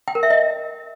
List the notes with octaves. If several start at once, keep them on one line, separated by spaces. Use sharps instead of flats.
G5
A#4
E5
D#5